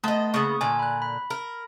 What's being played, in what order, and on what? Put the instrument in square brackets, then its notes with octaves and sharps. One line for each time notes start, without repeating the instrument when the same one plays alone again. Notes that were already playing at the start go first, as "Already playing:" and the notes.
[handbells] A3 A5 C6 [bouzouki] B3 D#5
[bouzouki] C#3 B3 [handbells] A#3 C#6 D#6
[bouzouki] A#2 D3 [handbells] G#5
[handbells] B5 F#6
B5
[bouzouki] A#4